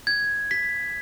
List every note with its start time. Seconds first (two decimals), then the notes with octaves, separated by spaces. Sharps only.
0.07 G#6
0.51 B6